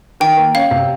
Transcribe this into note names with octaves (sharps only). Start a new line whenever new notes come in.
D#3 G5
A#3
C#4 F5
C3